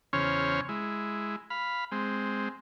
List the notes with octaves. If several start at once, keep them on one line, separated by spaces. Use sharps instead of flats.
E2 C#3 C#4 C5 C#5 F6
G#3 E4
F5 B5
G#3 C4